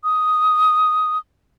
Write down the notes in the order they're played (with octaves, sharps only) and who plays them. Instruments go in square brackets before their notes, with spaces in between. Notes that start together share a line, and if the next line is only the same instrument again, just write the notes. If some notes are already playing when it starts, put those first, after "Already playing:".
[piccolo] D#6